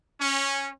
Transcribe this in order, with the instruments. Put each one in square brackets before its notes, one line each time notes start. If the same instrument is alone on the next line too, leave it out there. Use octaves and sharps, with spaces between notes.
[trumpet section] C#4